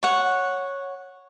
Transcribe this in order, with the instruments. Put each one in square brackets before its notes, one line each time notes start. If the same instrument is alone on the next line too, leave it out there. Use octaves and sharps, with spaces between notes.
[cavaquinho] C#5 F#5